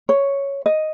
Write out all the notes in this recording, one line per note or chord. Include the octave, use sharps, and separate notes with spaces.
C#5
D#5